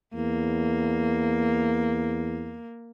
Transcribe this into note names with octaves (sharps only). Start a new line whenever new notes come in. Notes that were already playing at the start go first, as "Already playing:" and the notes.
E2 A#3